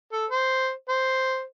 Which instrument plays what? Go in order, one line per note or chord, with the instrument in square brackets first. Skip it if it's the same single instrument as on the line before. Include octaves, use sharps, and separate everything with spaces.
[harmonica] A4
C5
C5